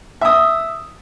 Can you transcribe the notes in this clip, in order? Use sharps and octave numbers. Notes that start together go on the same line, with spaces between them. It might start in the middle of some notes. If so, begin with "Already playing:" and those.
E5 D#6